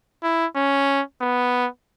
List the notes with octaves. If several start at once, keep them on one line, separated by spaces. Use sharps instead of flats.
E4
C#4
B3